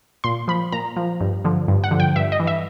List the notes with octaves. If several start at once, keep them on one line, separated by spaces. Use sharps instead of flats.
A#2 C6
F3 B5
A#2 A#5
F3
G2
D3 F3
G2
F#5
D3 F3
G5
G2 E5
D#5
E3
E5